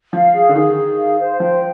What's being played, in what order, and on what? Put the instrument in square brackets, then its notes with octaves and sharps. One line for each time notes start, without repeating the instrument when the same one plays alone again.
[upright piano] F3 [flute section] F5
[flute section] G#4
[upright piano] D3
[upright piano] D#3 [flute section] G#4
[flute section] G#4
F5
C5
[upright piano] F3 [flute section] G5